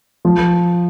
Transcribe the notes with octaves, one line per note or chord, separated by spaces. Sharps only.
F3